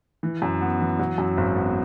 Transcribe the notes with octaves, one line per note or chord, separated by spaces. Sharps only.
E3
F#2
B3
E3
F#3
F#2
G#1
B3